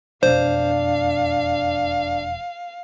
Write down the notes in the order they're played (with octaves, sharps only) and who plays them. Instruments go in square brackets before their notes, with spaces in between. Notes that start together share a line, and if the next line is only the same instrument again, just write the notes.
[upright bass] E1 F2 [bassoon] D4 [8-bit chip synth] C5 [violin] F5